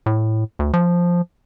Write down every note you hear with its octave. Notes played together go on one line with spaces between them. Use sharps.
A2
D2
F3